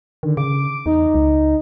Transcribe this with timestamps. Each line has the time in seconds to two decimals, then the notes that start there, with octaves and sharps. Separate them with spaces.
0.23 D3 D#3
0.37 C#3 D6
0.86 E2 D#4
1.14 C#2